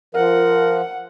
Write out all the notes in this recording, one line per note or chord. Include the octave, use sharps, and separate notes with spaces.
F3 A#4 F#5